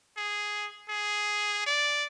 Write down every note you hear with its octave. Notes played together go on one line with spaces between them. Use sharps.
G#4
G#4
D5